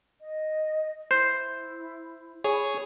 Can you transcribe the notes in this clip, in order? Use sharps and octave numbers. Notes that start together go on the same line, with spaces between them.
D#5
E4 C5
G#4 C#5 B5